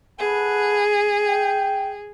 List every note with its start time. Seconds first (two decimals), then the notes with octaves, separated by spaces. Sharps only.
0.20 G#4 A4 B4 F#5
1.23 G5